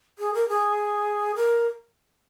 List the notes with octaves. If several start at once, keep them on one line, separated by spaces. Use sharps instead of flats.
G#4
A#4
G#4
A#4